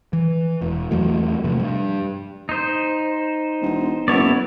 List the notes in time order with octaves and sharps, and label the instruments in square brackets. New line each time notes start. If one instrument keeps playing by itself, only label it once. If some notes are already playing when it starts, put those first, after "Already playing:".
[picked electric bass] E3
E1
E2 E3 F#3 A3
C3 F3 A3
G2
[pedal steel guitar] D#4 C5
[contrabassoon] E1
[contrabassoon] F#1 [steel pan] B3 [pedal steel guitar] E4 C#5 D5